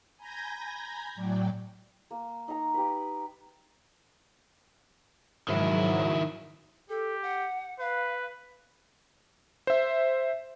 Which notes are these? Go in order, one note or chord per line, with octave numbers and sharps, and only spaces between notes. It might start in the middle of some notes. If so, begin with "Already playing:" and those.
G#5 A#5 B5 G6 G#6 A#6
A2 F#3 D5 G5
A#3
D#4 A#5
G4 B4
G#2 D#3 F#3 E4
G4 A4
F#5
B4 F5
C5 E5